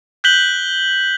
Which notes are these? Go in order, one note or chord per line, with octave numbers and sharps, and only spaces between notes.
F#6 G6 B6 F#7 G7